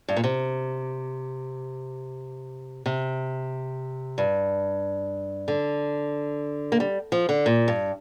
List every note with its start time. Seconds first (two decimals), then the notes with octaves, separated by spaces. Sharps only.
0.09 G2
0.17 A#2
0.24 C3
2.86 C3
4.18 G2
5.48 D3
6.72 A#3
6.80 G3
7.12 F3
7.29 D3
7.46 A#2
7.68 G2